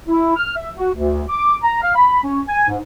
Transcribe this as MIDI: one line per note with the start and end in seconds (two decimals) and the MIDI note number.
0.08 0.35 64
0.37 0.56 89
0.56 0.71 76
0.77 0.88 66
0.94 1.24 38
1.29 1.56 86
1.63 1.80 82
1.81 1.94 77
1.95 2.19 83
2.24 2.41 61
2.49 2.66 80
2.69 2.78 44